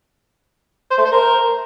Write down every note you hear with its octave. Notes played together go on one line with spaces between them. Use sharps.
C5
A3
C5
A#4